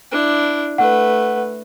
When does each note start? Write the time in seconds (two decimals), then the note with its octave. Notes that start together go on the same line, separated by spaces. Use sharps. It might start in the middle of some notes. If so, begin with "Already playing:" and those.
0.11 D4 E4
0.78 A3 B4 F#5